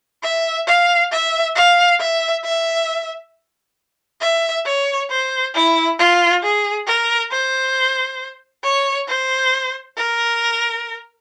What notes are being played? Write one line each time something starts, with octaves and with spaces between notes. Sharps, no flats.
E5
F5
E5
F5
E5
E5
E5
C#5
C5
E4
F4
G#4
A#4
C5
C#5
C5
A#4